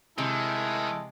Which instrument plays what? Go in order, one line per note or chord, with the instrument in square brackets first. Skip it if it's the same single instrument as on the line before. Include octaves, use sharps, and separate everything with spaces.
[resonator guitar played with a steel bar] C3 [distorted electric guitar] D#3 [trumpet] G#3 [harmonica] E4 E5 A5